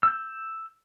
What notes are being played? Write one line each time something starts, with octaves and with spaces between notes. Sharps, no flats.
E6 G6